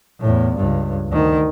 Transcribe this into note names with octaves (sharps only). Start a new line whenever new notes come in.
E2 A2
C#2 G2
D2 D#3